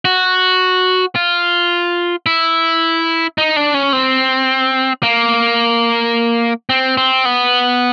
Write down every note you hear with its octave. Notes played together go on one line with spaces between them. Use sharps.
F#4
F4
E4
D#4
D4
C#4
C4
A#3
C4
C4
B3